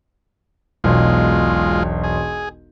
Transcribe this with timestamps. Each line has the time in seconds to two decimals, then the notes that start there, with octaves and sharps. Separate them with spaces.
0.84 E1 B1 G#3 F4
2.04 G#4